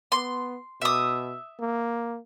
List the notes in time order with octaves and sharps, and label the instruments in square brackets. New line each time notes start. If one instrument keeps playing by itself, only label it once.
[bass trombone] B3 [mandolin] C6
[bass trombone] B2 [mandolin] E5 D#6
[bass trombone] A#3